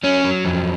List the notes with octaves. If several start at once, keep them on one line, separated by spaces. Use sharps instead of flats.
F#3 C#4
F#3
F2